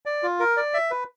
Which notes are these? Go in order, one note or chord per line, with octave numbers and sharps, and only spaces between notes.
D5
F4
A#4
D5
E5
B4